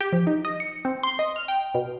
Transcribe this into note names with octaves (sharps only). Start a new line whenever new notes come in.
G4
F3
D#4
D#5
C#7
C4
C6
D#5
F6
G5
B2